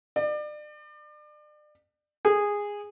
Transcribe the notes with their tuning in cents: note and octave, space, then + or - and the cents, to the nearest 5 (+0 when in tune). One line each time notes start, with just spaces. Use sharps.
D5 +35
G#4 -15